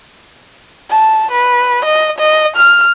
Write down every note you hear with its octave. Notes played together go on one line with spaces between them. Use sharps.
A5
B4
D#5
D#5
F6